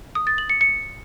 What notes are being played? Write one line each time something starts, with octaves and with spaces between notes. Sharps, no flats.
D#6
A6
F#7
C#7
C#7